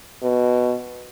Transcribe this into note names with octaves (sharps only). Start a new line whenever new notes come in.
B2